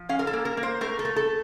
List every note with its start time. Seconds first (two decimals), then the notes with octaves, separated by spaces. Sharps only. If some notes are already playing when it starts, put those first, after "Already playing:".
Already playing: F3
0.09 C#4 F5
0.19 A#4
0.27 A4
0.33 A#3
0.45 A#4
0.57 A#3
0.63 C5
0.81 A3 A#4
0.99 A4
1.05 A3
1.16 A4